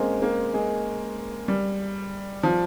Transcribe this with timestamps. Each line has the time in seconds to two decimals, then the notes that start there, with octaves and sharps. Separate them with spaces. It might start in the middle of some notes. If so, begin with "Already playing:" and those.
Already playing: G#3 A#3 C4 C#4
0.22 A#3
0.54 G#3
1.48 G3
2.43 F3